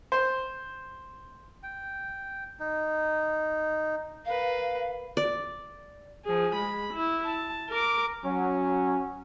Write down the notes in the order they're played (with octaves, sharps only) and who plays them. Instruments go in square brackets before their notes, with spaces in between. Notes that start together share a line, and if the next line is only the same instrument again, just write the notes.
[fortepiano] C5
[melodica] G5
D#4
[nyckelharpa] A#4 B4 [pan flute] F5
[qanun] D5
[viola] F3 G#4
G#3 B5
E4
A5
A#4 D6
[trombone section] F#3 [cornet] C#4